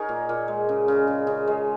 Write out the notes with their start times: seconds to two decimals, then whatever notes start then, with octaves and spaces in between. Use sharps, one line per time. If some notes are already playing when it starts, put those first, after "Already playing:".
Already playing: D#4 G#4 A#4 C#5
0.09 A#2
0.29 A#2
0.48 G#3
0.69 C#3
0.88 C#3
1.07 C#3
1.27 C#3
1.47 G#3